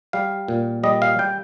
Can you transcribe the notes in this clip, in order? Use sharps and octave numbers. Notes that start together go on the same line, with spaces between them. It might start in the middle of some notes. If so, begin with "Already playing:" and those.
G3 F5
A#2
G3 D#5
F5
G3 G5